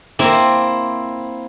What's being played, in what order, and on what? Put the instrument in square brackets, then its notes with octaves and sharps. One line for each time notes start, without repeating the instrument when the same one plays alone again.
[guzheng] A#3 C4 E4